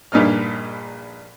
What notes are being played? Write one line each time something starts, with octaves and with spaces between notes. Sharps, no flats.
A#1 G2 A#2 D#4 D#5 F6